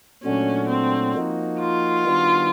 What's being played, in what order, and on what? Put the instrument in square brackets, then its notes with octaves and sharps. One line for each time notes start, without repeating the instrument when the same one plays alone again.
[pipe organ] A#2 F#3 A3 D4 F#4 [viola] C#4
[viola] C4
[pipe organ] F3 A#3 D#4 F#4
[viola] F4
[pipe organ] D#3 G3 B3 D4 F#4